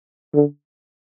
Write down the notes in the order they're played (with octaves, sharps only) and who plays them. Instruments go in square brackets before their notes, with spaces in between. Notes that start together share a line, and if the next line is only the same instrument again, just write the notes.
[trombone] D3